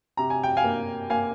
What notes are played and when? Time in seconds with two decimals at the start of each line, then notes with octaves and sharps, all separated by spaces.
0.17 C3 A#5
0.30 G#5
0.43 G5
0.57 F5 G#5
0.64 A#3
1.10 A#3 F5 G#5